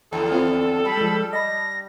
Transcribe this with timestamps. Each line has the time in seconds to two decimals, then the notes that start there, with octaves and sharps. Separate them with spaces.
0.13 D#2 D3 A4
0.32 C4 F4
0.85 G3 B5
0.97 F3 G#3
1.33 D#5 A5 B5 A#6